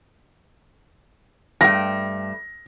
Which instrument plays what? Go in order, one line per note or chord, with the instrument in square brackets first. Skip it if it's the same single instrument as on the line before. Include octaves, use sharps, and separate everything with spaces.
[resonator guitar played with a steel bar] G2 A3 G5 [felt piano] A#6